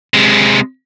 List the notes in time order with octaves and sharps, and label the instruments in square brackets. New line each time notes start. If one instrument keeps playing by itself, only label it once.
[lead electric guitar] C3 G#3